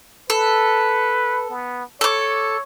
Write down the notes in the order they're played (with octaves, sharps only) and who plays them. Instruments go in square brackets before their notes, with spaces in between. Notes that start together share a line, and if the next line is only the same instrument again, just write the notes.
[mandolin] A4 [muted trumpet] B4
[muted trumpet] B3
[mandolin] A4 D6 [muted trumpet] C#5